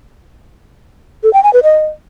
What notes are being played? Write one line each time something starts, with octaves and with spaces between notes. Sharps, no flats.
A4
G5
G#5
B4
D#5